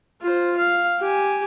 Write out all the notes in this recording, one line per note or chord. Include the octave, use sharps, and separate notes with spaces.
F4 C5
F5
G4 G#5